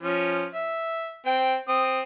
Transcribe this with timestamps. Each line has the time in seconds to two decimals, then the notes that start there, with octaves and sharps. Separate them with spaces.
0.03 F3 C#4
0.55 E5
1.26 C4 G5
1.68 C4 D#6